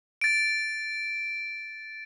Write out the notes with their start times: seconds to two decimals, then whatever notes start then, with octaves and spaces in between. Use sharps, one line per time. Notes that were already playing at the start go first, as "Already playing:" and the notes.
0.21 A6 D7